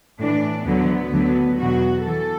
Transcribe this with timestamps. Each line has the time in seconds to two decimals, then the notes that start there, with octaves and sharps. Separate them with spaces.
0.19 A2 E3 D4
0.66 D2 D3 F#3 B3
1.13 D2 D3 F#3
1.60 E2 B2 F#3 F#4
2.06 E3 A4